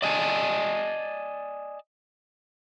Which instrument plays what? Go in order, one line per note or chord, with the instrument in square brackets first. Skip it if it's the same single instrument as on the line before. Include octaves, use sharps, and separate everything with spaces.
[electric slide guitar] D5 D#5 G#5 A5